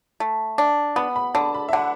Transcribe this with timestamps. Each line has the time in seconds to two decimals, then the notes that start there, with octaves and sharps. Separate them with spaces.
0.20 A3
0.58 D4
0.96 B3 B5
1.16 B5
1.35 D3 A5
1.54 B5
1.69 E5
1.73 D3 F#5